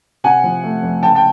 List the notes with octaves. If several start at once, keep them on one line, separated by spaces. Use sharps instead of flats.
C3 F#5 G#5
F3
A3
F2
C#3 G5 A5
G5 A5